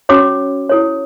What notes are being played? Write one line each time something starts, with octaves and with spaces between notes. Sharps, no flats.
C#4 F#4 C#5 D6
E4 A4 C#5